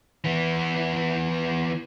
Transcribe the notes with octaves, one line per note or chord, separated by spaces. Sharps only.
E3 B3